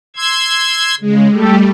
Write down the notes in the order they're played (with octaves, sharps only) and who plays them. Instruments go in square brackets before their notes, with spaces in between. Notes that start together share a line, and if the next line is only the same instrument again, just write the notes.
[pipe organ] C6 E6 G#6
[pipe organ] C#3 [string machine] G#3
[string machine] G3 A3 [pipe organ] G4 A4